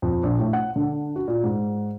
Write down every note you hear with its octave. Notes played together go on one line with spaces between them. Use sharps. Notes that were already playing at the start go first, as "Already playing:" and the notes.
F2
A#1
A2
F#5
D3
F#4
A#2
G#2